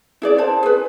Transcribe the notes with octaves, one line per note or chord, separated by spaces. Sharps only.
E4 G#4 D5
C5 A5
G#4 B4